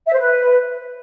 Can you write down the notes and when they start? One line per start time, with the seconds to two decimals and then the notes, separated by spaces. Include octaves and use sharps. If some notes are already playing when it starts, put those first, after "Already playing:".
0.07 E5
0.13 C5
0.19 B4